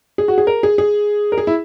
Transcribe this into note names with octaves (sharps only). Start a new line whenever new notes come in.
G#4
F#4
G#4
A#4
G#4
G#4
A#4
G#4
E4